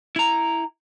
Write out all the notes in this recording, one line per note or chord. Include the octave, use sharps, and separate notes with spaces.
E4 A#5